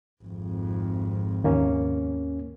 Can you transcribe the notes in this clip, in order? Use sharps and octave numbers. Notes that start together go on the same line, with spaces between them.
G#1 F2
D#2 A#3 C#4